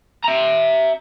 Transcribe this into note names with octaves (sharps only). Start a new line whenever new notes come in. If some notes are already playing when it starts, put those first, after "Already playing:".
E5 A#5